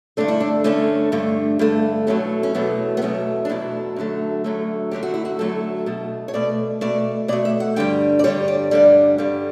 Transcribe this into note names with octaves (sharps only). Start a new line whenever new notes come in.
G2 D3 A3 D4
E4
D4
G2 D3 A3 C#4
G2 D3 A3
G2 D3 A3
E2 B2 F#3 A3 C#4
C#4
E2 B2 F#3 A3 B3
B3
E2 B2 F#3 A3 C#4
D4
E2 B2 F#3 A3 E4
F#2 D3 F#3 A3
F#2 D3 F#3 A3
F#2 D3 F#3 A3 G4
F#4
E4
F#4
F#2 D3 F#3 A3 A4
B2 A3
C#5
B2 A3 D5
B2 A3 D5
B2 A3 D5
E5
F#5
G2 D3 G3 G5
D5
G2 D3 G3 C#5
D5
G2 D3 G3 D5
G2 D3 G3